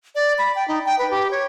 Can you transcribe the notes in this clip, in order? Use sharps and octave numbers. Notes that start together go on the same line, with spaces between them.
D5
B5
G5
D#4
G5
B4
G4
C#5